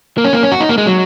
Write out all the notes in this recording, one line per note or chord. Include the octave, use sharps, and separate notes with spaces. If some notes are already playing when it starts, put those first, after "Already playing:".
A#3
C#4
A#3
C#4
F#4
D#4
A#3
G#3
F#3